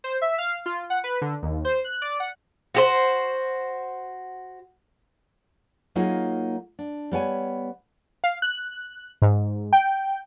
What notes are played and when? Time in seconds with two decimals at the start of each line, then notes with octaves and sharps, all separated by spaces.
0.04 C5
0.22 E5
0.38 F5
0.66 F4
0.90 F#5
1.04 B4
1.21 D3
1.43 D#2
1.65 C5
1.84 F#6
2.02 D5
2.20 F#5
2.75 F#4 G4 C5
5.95 F#3 A#3 D#4 F4 G#4 G#5
6.79 D4
7.11 G3 B3 C#5 G#5
8.24 F5
8.42 F#6
9.22 G#2
9.73 G5